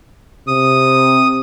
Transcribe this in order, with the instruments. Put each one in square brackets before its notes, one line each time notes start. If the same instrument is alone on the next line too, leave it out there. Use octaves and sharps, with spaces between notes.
[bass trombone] C3 [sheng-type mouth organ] D#6